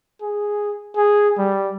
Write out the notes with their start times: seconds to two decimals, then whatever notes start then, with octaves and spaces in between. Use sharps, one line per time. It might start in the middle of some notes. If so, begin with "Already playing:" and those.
0.21 G#4
0.97 G#4
1.38 G3